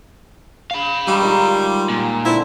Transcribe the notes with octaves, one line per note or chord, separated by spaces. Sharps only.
F5 B5
G3 G#3 A#5 C#6
D#3 F4 A#5
A#2
D3 C4 E4